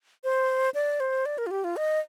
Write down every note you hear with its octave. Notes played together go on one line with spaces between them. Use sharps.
C5
D5
C5
D5
A#4
F4
G4
F4
D#5